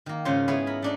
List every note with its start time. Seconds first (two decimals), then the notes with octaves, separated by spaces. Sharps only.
0.06 D#3 A#3
0.25 G#2 C#3 G#3 C#4 F4 C5
0.48 B3 E4 G#4 C#5
0.67 A#4 B5
0.82 A3 D4 D#4